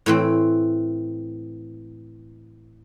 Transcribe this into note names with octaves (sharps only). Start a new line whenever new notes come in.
A2 E3 C4